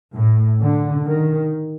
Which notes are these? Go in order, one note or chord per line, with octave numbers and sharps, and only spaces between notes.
A2
D3
D#3